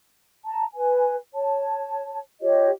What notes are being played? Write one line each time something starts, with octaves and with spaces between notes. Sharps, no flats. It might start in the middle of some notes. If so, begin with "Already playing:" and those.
A5 A#5
B4 G#5
C#5 A5
F4 G4 C#5 D#5